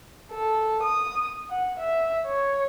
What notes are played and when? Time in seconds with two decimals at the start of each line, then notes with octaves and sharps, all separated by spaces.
0.31 A4
0.83 D#6
1.50 F#5
1.79 E5
2.26 C#5